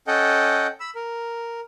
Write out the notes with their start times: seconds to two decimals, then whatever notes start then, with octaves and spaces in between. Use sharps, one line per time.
0.07 C#4 A4 D#5 F#5 G5
0.80 B5 E6
0.95 A#4